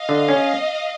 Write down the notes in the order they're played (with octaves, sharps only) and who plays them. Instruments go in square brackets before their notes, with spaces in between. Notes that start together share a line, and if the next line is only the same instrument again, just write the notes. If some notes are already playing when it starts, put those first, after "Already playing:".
Already playing: [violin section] D#5 F5
[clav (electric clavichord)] D3
C#4